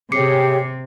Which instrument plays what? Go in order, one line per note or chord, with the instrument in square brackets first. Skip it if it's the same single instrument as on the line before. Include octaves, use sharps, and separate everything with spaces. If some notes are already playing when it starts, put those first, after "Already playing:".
[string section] C3 [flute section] G4 G#4 C#5 [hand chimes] D6 C7 C#7